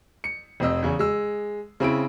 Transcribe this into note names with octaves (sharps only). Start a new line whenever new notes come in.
C#7
F1 C4 D#5 E6
E2 C#3
G#3 E6
C#3 C4 E4 D7